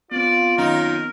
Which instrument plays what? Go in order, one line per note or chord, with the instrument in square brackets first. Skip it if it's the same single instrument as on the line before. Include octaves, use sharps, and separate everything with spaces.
[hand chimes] B3 C4 [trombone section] F4 [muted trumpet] D5
[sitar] F#2 D#3 D#4 [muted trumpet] A#4